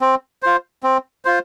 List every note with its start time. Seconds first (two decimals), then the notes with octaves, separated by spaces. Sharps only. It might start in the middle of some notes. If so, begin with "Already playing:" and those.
0.01 C4
0.43 F4 C5
0.83 C4
1.25 F4 C5